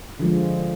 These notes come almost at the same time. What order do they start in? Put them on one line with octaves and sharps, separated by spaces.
D3 F3 G#3